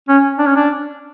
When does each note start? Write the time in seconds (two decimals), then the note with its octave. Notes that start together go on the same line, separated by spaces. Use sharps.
0.08 C#4
0.39 D4
0.47 C#4
0.56 D4